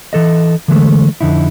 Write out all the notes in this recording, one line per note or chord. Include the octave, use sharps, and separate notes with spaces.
E3 A4 D#5
D3 E3 G#3 A3
F2 D3 D#4 E4